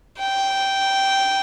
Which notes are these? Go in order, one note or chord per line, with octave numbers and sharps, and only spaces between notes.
G5